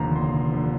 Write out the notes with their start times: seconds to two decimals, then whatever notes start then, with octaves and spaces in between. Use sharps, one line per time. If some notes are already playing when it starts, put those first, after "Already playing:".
Already playing: F1 D#2 D3 F3 A#5 C6
0.16 F1 C6
0.52 D3 F3